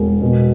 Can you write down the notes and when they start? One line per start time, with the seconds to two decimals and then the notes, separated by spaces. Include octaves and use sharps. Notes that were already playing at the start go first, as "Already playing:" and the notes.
Already playing: E1
0.22 B2